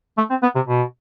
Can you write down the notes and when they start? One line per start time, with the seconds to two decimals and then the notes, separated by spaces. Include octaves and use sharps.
0.18 A3
0.30 C4
0.42 B3
0.55 C3
0.67 B2